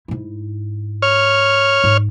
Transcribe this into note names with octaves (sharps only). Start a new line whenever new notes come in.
G#2 E4
C#5 F6
G#2